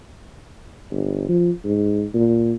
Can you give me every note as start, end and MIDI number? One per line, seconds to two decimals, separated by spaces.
0.91 1.28 31
1.29 1.51 53
1.64 2.04 44
2.14 2.54 46